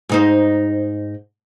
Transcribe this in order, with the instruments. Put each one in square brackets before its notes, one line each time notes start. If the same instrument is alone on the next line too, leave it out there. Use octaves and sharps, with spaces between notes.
[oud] G#2 D#4 C5